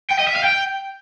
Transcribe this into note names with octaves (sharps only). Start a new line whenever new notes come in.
G5
D#5
E5
F5
G5